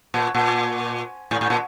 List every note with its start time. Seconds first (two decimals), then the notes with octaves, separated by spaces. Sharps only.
0.14 A#2
0.35 A#2
1.31 A2
1.41 A2
1.50 A#2